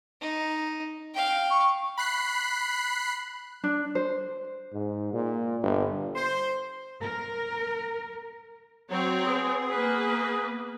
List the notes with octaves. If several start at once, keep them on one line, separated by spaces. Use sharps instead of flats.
D#4
F5 G5
C#6
B5 F#6 C7
D4
C5
G#2
A#2
G1
C5
A#4
F#3 C4 C#5
B3 G#4
A#3 B4